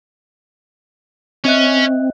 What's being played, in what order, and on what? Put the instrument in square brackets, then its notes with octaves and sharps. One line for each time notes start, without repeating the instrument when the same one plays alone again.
[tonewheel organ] C4 [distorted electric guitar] C#4 [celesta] D#5 E5 F#6